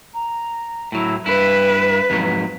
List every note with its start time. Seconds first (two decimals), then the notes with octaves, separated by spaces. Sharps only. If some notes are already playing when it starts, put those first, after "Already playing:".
0.14 A#5
0.92 A2 F#3 E4
1.26 G2 E4 B4 B6
2.10 F2 G#2 F#3